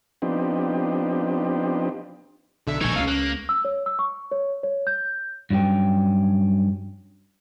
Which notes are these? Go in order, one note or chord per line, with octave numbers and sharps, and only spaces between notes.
F3 B3 C4 D4 D#4 G4
B1 D3 E5
A#1 D#3 D#4 A4 G#5 C#6 G#6
C#2 G3 C#4 F5
A#3 F#6
E6
C#5
E6
C#6
C#5
C#5
G6
G2 F#3 C#4 G5